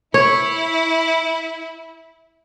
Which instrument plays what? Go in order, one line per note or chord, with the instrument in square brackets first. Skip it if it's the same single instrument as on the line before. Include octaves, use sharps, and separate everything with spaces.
[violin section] E4 [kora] C#5